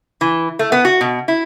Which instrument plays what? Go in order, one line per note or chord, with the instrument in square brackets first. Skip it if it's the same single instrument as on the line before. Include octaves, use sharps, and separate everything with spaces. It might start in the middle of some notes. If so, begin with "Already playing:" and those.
[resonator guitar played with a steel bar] E3
A3
B3
F#4
B2
E4